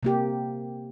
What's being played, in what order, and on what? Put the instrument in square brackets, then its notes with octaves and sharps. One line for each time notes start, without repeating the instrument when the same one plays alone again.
[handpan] C3 A#3 G4